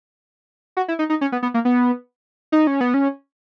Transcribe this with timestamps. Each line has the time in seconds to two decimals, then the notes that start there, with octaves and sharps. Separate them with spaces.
0.77 F#4
0.88 E4
0.99 D#4
1.10 D#4
1.21 C#4
1.32 B3
1.43 B3
1.54 A#3
1.65 B3
2.52 D#4
2.67 C#4
2.81 B3
2.94 C#4